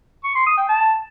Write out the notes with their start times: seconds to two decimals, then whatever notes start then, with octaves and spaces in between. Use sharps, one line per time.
0.24 C#6
0.35 C6
0.46 D#6
0.57 G5
0.69 A5